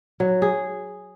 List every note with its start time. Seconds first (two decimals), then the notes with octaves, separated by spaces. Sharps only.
0.20 F#3
0.42 G#4